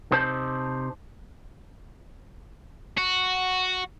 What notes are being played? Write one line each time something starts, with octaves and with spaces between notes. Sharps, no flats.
C3 D#4 C5 A5
F#4